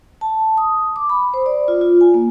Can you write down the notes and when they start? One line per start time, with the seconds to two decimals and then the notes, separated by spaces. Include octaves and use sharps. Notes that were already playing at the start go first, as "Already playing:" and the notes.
0.21 A5
0.58 D#6
0.96 D6
1.10 B5
1.34 C5
1.46 D5
1.68 F4
1.81 F4
2.01 G#5
2.14 A#3